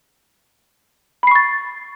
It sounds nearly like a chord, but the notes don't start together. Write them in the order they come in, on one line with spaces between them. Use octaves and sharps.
B5 C7 C#6 A6